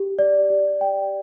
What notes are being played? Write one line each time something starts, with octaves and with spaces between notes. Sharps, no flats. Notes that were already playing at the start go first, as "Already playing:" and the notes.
Already playing: G4
D5
G4
G5